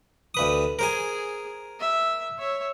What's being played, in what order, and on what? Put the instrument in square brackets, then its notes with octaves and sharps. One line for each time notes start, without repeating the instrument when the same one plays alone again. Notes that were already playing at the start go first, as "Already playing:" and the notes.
[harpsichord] D2 B4 D#6
[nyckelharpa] G#4 [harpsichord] A#4 C5 G#5
[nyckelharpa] E5
C#5 E5